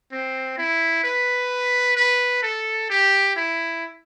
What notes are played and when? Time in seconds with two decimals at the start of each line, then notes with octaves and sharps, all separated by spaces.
0.12 C4
0.58 E4
1.03 B4
1.97 B4
2.42 A4
2.90 G4
3.36 E4